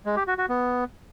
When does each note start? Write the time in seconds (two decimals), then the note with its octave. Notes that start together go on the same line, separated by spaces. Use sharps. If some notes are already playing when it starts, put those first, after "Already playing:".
0.06 G#3
0.16 G4
0.27 F#4
0.38 F#4
0.49 B3